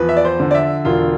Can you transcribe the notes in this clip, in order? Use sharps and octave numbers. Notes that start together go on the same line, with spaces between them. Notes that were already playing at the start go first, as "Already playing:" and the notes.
Already playing: E2 F3 B4
E5
D5
C5
D3
D5
E5
E1 F4